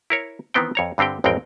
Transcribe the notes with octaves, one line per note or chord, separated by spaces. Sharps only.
E4 A#4 C#5
D#3 E3 B3 C4 G5
F2 C#5 A#5
G2 D3 C4 G4 G5
A1 F2 G#3 C4 A#4 G5